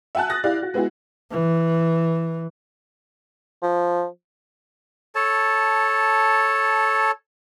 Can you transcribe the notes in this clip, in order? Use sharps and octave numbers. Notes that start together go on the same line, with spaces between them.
E5 F#5 G#5 A5 F#6
D#6 F#6 A6 A#6
E4 G4 D5 F5
F#4
G#3 B3 E4 F#4 G#4
E3
F3
A4 C#5 A5